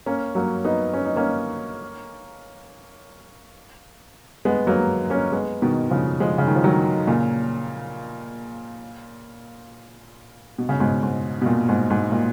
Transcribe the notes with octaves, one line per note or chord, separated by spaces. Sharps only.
A#3 C#4
F#3 A#3
B3 D#4
C#4
D#4
A#3 C#4
G#3 B3
F#3 A#3
A#3 C#4
G#3 B3
B2 D#3
C#3 F3
F3 G#3
C#3
D#3
F3
D#3 F#3
A#2 C#3
B2
C#3
G#2 B2
G#2
B2
A#2
G#2
G#2
A#2